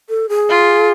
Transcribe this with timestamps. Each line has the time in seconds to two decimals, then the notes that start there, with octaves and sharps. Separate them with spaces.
0.09 A4
0.29 G#4
0.50 F4